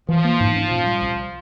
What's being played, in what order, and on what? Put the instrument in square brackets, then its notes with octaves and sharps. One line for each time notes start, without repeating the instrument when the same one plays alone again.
[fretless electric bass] E3 [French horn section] F3
[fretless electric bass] A#3
G#2
C#4
A#2
G3
C2